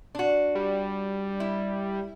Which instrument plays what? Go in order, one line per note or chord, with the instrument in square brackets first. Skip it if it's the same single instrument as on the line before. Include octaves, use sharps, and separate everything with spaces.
[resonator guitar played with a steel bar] D4 F#4
[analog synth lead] G3
[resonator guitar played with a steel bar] E4